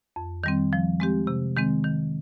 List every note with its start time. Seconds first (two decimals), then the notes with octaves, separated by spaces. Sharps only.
0.16 F2
0.44 D#3 G3 C4
0.73 F3
1.00 G#3 C4 G4
1.27 C3
1.56 D#3 G#3 C4
1.84 D#3